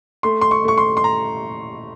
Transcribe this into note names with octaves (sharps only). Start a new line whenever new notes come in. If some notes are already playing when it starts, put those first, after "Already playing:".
A3 C6
C6
C#6
A3 C#6
C6
C6
A#5